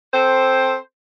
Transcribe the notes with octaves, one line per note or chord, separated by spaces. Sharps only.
C4 A4 C5